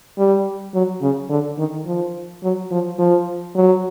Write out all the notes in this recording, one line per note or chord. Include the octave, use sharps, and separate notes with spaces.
G3
F#3
C#3
D3
D#3
F3
F#3
F3
F3
F#3